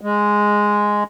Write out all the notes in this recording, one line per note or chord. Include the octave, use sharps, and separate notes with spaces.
G#3